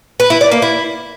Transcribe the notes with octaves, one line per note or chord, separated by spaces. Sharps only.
B4
E4
D5
A#3
E4